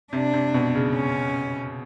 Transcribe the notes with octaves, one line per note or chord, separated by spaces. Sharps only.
C3 D4
C3
B2
C#3
C#4